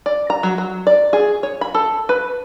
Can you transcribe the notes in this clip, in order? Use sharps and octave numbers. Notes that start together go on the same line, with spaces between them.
D5
A#5
F#3
F#3
D5
G#4
C#5
B5
A4
B4